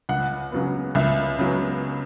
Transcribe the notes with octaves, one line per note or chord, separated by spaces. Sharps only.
C#2 F#5
C#3 F#3 B3
C#2 E5
C#3 F#3 B3